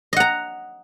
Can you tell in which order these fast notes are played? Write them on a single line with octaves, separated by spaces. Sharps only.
D#5 F#5 A#5